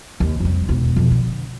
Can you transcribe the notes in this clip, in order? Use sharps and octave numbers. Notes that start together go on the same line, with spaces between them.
D#2
F2 G3
E1 D#2
F2 B2
D3